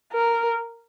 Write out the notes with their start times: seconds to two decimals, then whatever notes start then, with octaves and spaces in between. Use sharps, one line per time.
0.13 A#4